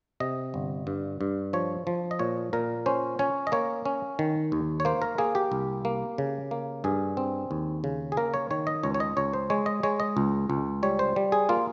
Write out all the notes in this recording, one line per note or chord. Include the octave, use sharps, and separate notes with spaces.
C3 D#5
G1
G2
G2
F3 C#5
F3
D#5
A#2 C#5
A#2 A#4
C#4 C5
C#4 C#5
D#5
A#3 C#5
C#4
D#3
D#2
C#5
A#3 C5
A#4
A#3 G#4
G4
C2
A#3
C#3
A#3
G2 G#4
C4
D#2
C#3
G#4
A#3 A#4
C#5
D#3 C#5
D#5
C#2 C#5
C#5
D#5
C#2 C#5
C5
G#3 C#5
D#5
G#3 C#5
D#5
C#2
C#2
G3 C#5
C5
G3
G#4
A#3 F4